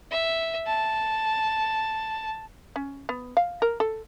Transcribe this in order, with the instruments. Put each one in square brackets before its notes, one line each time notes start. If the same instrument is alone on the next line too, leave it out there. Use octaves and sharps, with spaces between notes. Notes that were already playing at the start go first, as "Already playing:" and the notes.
[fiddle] E5
A5
[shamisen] C#4
B3
F5
A#4
A4